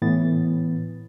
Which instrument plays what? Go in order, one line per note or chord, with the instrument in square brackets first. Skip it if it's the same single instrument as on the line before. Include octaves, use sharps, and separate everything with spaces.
[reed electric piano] A2 E3 B3 A6